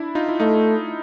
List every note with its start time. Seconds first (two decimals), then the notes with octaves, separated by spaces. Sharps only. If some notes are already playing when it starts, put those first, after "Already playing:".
Already playing: D4 E4
0.15 D#4 F4
0.29 E4
0.40 A3 D#4 F4